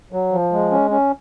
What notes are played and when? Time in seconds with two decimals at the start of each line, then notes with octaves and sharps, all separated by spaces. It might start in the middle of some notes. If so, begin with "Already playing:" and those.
0.12 F#3
0.32 F3
0.52 G#3
0.72 C#4
0.91 C#4